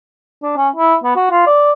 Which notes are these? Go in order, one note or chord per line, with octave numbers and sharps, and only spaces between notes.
D4
C#4
E4
B3
F#4
F4
D5